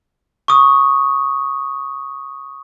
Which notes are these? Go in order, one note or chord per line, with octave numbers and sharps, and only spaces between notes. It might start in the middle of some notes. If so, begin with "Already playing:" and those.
C#6 D#6